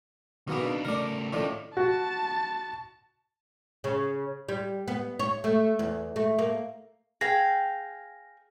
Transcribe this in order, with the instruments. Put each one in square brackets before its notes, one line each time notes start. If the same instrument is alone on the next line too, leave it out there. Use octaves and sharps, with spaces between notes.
[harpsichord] B2 A#3 B3 [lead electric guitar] D#3 G#4
[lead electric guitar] D4 D#4
[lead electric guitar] C#3 A3 [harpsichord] A#4 D5
[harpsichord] A2 D#3 D4 [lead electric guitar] C#4 F4
[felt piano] F#4 [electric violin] A5
[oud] C#3
G3
B3
C#5
A3
E2
A3
A#3
[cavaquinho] G#4 F5 G5 [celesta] A#6